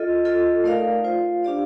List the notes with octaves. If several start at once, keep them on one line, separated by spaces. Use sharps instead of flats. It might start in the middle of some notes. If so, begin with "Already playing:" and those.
Already playing: F4 A4 D#5
F4 A4 D#5
A3 D#4 A#4 D5 F5
F4 C5 F5
D4 G4 D5 F5